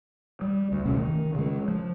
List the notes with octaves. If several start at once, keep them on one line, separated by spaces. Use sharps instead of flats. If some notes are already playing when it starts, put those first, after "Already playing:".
G3
D2
D2 C3 A3 C#4
D#3
C#3 G#3
F3